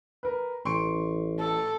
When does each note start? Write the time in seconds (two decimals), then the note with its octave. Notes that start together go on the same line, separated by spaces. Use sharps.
0.23 A#4 B4
0.65 A1 C6 C#6 D7
1.40 A4